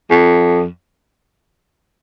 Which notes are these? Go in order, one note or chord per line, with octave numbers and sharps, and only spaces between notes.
F2